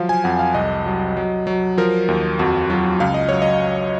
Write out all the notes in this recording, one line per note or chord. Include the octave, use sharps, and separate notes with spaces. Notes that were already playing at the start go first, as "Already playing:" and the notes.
Already playing: F3 F#3 F5
G#5
F2 F#5
F5
C2 D#5
F#3
F#3
F#3
F3 A#4
D#2
F2 F#4
F#3 F4
C#2 F5
D#5
F#3 C#5
D#5